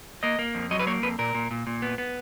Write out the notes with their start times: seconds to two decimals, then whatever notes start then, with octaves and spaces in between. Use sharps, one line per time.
0.23 A#3 D#5
0.39 A#3
0.55 F2
0.71 F#3 D#5
0.79 B4
0.87 A#3 C#5
1.03 F2 B4
1.18 A#2 A#4
1.35 A#2
1.51 A#2
1.67 A#2
1.82 B3
1.98 B3